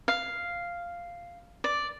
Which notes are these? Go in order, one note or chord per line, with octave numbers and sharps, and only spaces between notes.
F5
D5